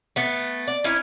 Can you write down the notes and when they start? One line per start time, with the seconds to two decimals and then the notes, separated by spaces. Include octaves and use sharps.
0.16 A3 B3
0.68 D5
0.84 C#4 D#4 E4